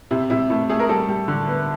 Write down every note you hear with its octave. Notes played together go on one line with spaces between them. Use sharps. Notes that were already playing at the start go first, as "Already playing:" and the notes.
C3 E4
C3 E4
A3 E4
A3 G#4
A#4
G3 A4
G3
D3
B3